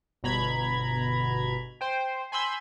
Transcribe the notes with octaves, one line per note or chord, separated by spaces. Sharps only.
G1 B2 A#5 B5 G#6
C5 G5
G#5 B5 C6 E6 G6